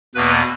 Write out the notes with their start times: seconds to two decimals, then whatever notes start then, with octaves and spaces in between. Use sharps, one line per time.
0.15 E2 B2 A#3 B4